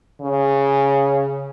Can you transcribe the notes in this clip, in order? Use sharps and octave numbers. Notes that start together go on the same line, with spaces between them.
C#3